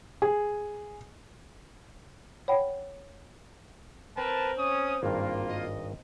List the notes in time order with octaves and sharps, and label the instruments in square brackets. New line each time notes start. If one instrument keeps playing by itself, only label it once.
[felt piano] G#4
[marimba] C#5 F#5 G5 B5
[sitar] C4 [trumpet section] A#4 B4 A5
[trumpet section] C#4 D#6
[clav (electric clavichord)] G#1 G2 [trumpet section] A#3 F4
[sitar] D#5